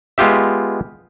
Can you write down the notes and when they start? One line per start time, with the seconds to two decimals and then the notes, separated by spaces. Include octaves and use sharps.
0.18 G#3 B3 F4 G4 E5